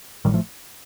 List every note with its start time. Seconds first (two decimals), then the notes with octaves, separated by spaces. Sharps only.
0.25 A1 A2 D#3 G3
0.34 F3 A3